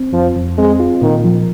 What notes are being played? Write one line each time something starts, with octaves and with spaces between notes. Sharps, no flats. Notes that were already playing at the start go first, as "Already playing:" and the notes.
Already playing: C4
F2 F3
F2
G#3 C4
F4
A#2 D#3
F3